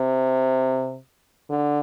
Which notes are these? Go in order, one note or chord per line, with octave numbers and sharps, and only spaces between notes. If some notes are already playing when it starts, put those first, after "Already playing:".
Already playing: C3
D3